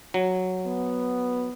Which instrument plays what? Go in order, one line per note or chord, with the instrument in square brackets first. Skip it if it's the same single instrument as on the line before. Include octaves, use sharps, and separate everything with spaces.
[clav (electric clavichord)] F#3
[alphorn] B3